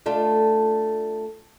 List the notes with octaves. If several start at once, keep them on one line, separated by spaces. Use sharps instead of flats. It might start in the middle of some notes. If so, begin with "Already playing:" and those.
A3 D4 F4